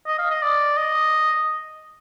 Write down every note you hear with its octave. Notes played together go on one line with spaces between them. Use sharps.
D#5
F5
D#5
D5
D#5